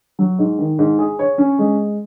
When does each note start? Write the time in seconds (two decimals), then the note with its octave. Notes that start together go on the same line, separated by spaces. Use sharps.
0.19 F#3
0.39 G#2
0.59 D#3
0.79 G#2
0.99 G#4
1.19 C#5
1.38 C#4
1.59 G#3